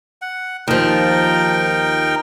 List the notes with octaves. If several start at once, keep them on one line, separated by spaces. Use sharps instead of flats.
F#5
D#2 F3 D#4 A#4 G5